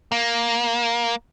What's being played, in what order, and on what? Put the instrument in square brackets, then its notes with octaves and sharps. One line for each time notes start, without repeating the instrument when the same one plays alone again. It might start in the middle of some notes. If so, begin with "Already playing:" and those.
[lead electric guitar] A#3